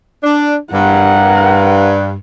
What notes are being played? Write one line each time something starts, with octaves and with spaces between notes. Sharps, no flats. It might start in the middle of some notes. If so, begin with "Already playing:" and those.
D4
G2 A#4 F#5